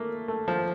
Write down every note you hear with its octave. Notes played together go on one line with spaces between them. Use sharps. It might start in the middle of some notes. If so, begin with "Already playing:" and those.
Already playing: A3 A#3
A3
F3